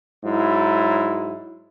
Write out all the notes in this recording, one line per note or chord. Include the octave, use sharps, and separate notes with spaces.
G#2 F#3 E4